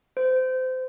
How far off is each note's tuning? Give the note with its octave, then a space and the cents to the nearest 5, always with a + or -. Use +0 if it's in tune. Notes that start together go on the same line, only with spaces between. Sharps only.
C5 -25